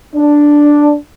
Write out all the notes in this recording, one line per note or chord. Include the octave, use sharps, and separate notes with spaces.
D4